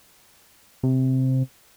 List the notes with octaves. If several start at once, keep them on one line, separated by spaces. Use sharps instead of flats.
C3